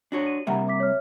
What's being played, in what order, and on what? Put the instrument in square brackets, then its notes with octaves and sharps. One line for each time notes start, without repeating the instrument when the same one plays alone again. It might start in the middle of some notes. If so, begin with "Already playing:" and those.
[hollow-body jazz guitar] D4 F#4 C#5
[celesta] D#7
[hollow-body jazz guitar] C3 G3 A#3 [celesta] E5 F#5 A#5
[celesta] E5 D6 B6
C#5 E5 F6